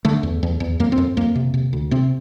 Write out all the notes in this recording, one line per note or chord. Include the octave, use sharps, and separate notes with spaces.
D3 A3
E2
E2
E2
F2 A#3
C4
F2
F2 A#3
C3
C3
D2
C3 C4